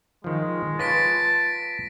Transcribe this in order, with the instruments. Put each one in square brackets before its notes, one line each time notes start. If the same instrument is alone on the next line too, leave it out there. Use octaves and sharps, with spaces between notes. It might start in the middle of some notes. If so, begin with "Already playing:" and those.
[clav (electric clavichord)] D#3 F3 [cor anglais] G#3
[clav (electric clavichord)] F4 B4 C#5 [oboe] A5 [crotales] A#6 B6 D7